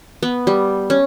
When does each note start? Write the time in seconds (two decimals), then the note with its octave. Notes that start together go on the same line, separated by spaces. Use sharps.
0.23 B3
0.47 G3
0.90 C#4